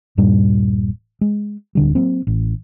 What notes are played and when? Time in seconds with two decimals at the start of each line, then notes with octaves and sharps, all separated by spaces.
0.17 D#1 G2 A#2 G3
1.21 G#3
1.75 D1 D3 G3
1.95 F#3 A#3 C4
2.27 A1